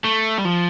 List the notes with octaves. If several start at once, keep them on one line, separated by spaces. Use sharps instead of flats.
A3
G3
F3